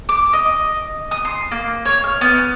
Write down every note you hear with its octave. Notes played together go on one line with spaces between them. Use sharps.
D6
D#5
D#6
C6
A#3
C#5
F6
B3